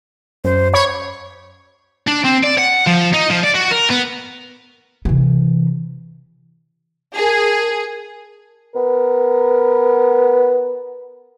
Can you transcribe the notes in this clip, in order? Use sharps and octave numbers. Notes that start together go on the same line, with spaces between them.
F#2 C5
C#5 B5
D4
C4
D5
F#5
F3
D#4
F3
D5
F#4
A#4
B3
C3 E3
G#4 A#4 A5
B3 A#4